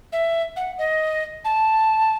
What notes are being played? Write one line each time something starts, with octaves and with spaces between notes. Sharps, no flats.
E5
F#5
D#5
A5